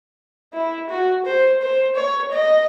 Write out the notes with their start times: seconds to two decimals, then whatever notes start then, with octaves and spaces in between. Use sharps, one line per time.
0.54 E4
0.89 F#4
1.26 C5
1.61 C5
1.96 C#5
2.32 D#5